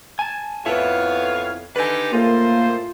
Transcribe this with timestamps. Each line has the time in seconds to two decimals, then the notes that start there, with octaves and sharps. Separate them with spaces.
0.19 G#5 A5
0.66 F2 B3 E4 A4 C#5 E5 F5
1.76 D3 D#4 G4 B4 G#5
2.13 A2 C#3 A#3 F4 C5